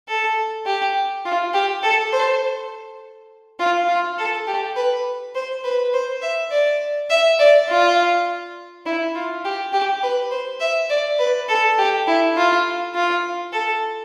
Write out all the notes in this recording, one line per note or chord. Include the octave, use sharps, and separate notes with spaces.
A4
G4
F4
G4
A4
C5
F4
F4
A4
G4
B4
C5
B4
C5
E5
D5
E5
D5
F4
E4
F4
G4
G4
B4
C5
E5
D5
B4
A4
G4
E4
F4
F4
A4